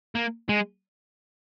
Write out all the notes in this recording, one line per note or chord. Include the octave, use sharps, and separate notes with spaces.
A#3
G#3